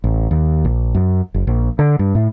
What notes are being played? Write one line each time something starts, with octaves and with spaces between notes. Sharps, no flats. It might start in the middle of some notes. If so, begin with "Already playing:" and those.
A1
D#2
A#1
F#2
F#1
A#1
D3
G2
A2